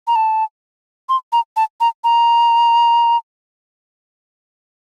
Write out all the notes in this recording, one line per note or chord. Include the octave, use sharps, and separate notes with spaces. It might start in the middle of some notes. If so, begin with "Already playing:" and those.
A#5
A5
C6
A#5
A5
A#5
A#5